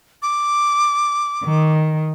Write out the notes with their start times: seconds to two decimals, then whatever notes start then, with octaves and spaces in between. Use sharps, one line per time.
0.22 D6
1.44 D#3